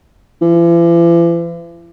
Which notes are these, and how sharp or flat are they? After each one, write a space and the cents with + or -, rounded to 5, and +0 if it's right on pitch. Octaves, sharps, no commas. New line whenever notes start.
E3 +45